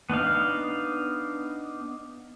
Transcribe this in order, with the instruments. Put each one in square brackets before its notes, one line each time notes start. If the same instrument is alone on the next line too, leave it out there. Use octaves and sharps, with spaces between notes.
[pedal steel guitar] B3 D4 D#4 F5